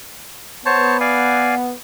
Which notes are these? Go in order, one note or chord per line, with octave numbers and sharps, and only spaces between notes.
B3 C5 C#5 A5
D5 F5 G#5